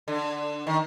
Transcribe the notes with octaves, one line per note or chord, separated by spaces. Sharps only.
D3
D#3